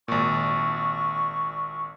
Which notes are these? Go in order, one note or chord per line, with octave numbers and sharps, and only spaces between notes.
G#1 A#2 C#6